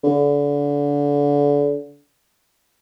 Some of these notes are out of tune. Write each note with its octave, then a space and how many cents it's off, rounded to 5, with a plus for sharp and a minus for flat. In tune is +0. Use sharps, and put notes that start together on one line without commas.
D3 -30